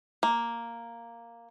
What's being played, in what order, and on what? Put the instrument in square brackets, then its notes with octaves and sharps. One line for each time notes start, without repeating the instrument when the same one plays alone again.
[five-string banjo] A#3